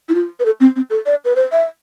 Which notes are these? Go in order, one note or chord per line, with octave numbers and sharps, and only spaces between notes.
E4
F4
B4
A4
C4
C4
A4
D5
B4
C5
E5